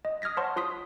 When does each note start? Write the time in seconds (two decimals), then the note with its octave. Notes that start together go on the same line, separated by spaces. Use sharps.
0.05 D#5
0.22 D#6 F6 G#6 A#6 B6
0.37 C5 C#5 F#5 A5 C6 C#6
0.56 F4 C6 D#6 B6